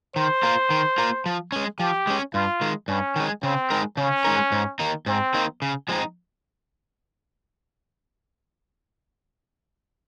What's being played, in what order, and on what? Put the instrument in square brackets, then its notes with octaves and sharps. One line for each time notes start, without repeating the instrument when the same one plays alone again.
[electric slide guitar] D#3 [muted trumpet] C5
[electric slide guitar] A#3 F4 A#4
D#3
A#3 F4 A#4
F3
G#3 C#4
[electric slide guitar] F3 [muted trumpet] G4
[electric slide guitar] G#3 C#4
[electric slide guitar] G2 [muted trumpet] F4
[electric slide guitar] D#3 G#3
[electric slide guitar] G2 [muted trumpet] C#4
[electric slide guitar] D#3 G#3
[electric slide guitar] C#3 [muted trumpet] C4
[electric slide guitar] G#3 D#4 A#4
[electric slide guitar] C#3 [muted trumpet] C#4
[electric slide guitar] G#3 D#4 A#4
G#2
D#3 A#3 D#4
[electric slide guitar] G#2 [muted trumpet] C4
[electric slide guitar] D#3 A#3 D#4
C#3
F3 G#3 C4 D#4